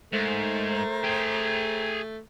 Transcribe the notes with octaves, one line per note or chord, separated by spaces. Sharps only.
G#2 A3 A#4 C5 A#5
G#4 G5